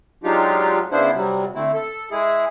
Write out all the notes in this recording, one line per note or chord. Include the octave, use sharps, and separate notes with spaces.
F#3 G#3 D4 D#4 F4 G4
C#3 B3 D4 E4 C5
C3 F#3 G3
D3 A3 C4 E4
A4
G#3 E4 G#4